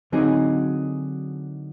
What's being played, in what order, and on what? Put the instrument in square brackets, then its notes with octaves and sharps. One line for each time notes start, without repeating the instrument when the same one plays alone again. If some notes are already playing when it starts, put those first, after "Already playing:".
[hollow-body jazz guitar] D3 F#3 C4 D#4 G#4